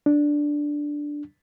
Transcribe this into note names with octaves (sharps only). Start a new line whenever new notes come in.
D4